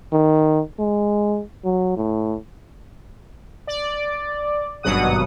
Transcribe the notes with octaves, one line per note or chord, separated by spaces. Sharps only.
D#3
G#3
F#3
A2
D5
G#1 G2 B2 F#3 F#5 D#6